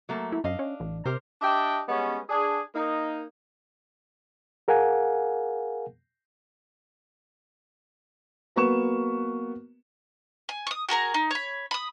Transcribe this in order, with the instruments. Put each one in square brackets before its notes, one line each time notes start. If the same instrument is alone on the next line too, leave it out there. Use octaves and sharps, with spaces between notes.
[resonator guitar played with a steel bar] F#3 A3 A#3
[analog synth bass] E4
[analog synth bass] F#2 [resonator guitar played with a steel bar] D4 D#5 F5
[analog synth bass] C#4
A1
[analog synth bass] C3 [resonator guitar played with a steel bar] G4 A#4 C5
[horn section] D4 G4 D#5 E5 G5
G3 G#3 B3 C#4
D4 G#4
A#3 D#4
[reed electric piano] G#4 A#4 F5 F#5 G#5
[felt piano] F#3 A#3 B3 B4 C#6 E7
[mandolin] G#5
C#6 D#6
F#4 G#4 A#4 A#5
D#4
C#5 B5
B5 D#6